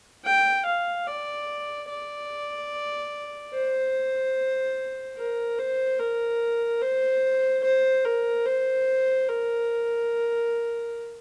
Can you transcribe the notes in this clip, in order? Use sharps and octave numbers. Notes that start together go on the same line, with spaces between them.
G5
F5
D5
D5
C5
A#4
C5
A#4
C5
C5
A#4
C5
A#4